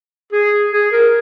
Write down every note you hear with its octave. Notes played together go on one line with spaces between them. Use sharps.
G#4
G#4
A#4